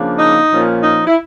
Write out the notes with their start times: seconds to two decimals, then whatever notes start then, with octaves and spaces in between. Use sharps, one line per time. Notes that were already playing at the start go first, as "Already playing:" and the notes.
Already playing: C#3 F3 A#3 D4
0.19 D#4
0.51 A#2 F3 A#3 C#4
0.83 D#4
1.07 E4